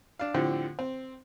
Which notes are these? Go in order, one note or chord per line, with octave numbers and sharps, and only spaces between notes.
D4 F5
A2 D3 F3 C4 G4
C4